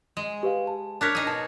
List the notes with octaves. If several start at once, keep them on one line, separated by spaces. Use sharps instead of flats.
G#3
G4 B4 F5
A5
D4 A#4 C#5 A5 F#6 B6
D#4 G#4
B2 A5